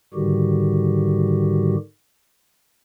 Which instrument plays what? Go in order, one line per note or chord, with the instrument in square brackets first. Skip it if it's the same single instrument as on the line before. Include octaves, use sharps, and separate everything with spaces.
[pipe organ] G#2 D3 D#3 G3 F#4 G4